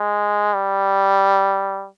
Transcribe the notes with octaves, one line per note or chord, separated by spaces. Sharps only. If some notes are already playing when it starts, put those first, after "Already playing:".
Already playing: G#3
G3